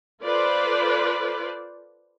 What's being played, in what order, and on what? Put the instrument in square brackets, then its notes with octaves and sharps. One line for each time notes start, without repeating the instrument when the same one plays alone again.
[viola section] F4 A4 B4 C5 D5